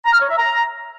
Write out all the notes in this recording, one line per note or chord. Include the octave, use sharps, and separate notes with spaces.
A#5
F6
C#5
E5
A#5